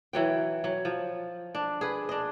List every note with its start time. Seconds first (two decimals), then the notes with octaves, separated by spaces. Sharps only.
0.13 E3 F#3 G5
0.64 F#3
0.85 F3
1.55 D4
1.81 G#4 B4
2.09 D4 D#5